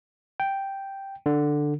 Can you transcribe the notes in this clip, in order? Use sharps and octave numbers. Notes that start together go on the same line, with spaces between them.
G5
D3